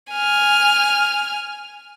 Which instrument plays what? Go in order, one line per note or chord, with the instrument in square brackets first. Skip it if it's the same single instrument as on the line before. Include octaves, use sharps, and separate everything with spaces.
[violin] G#5 F6